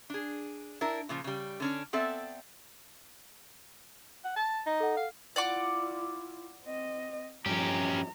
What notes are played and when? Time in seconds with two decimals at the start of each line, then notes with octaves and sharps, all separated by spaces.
0.10 D4 G#4
0.81 D4 E4 A#4
1.09 A#2 C#3 F3
1.24 C#3 G3
1.60 D3 C#4 D4
1.93 B3 C4 A4 D5 E5
4.25 F#5
4.36 A5
4.67 D#4
4.80 A4 F#5
4.97 F5
5.36 E4 F4 D5 F#5 D6
6.64 C4 D#5
7.46 G2 F3 C#4 G4 A#5